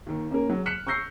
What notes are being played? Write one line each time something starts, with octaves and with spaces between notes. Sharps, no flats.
D#2 D#3
A#3 C#4 A#4
F#3 G#3
F6 F#6 B6 C#7 E7 F#7
C#6 E6 G6 A#6 C7